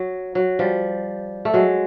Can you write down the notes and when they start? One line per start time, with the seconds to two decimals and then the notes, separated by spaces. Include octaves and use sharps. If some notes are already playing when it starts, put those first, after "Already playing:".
Already playing: F#3
0.35 F#3
0.59 F3 G3
1.45 A3
1.54 F#3 G#3